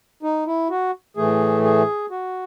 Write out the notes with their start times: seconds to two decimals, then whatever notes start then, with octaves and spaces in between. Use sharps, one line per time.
0.23 D#4
0.47 E4
0.70 F#4
1.17 A2 E3 A3 G#4
1.64 G#4
2.11 F#4